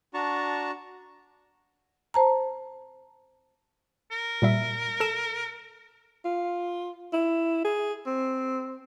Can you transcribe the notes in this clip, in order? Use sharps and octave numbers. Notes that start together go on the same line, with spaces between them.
D4 F#4 A5 A#5 C#6
C5 A5 A#5
A#4
A#2 G3 E5
A4 E7
F4
E4
G#4
C4